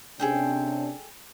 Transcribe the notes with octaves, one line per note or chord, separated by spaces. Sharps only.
C3 C#4 D4 G#4 A4 G5